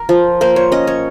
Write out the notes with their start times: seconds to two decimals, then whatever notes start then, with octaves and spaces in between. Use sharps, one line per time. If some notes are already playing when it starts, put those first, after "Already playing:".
Already playing: A#4
0.09 F3
0.41 A#3 C5
0.56 C#5
0.72 C#4 D#5
0.87 C#5